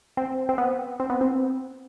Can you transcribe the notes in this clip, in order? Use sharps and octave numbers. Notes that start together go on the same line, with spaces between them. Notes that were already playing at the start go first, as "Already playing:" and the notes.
C4
C4
B3
C4
B3
C4